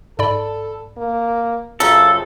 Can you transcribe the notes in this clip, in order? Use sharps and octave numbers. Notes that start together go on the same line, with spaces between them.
G#2 A4 D5 B5
A#3
F#2 C#3 C4 F4 A4